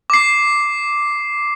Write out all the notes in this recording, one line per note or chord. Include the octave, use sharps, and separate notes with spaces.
D6 C7